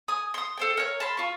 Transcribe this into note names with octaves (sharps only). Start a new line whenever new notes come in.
G#5 D#6
C6 D#6
A4 C5 G5
A#4 C#5
A5 B5 C6
F4 C#6